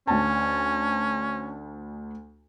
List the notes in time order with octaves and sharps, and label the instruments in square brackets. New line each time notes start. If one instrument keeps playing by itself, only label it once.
[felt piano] D2 A5 [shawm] C#4